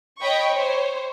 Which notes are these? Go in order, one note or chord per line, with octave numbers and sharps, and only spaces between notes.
C#5 D#5 G5 B5 C#6
C5 C#5